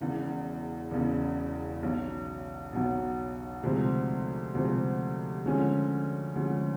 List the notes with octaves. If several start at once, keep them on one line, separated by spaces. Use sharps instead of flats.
E1 E2 C#3
E1 E2 C#3
B1 B2 F#3
B1 B2 F#3
D2 C3 F3 G#3 C4
D2 C3 F3 G#3 C4
D2 D3 F3 G#3 C#4
D2 D3 F3 G#3 C#4